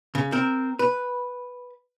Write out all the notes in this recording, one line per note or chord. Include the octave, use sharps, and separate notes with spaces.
C#3
C4 A#4
B4